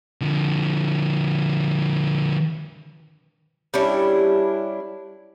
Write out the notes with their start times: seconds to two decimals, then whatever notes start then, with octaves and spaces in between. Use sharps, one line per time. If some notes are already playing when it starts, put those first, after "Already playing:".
0.21 D3 F3
3.74 G3 C#4 D4 E4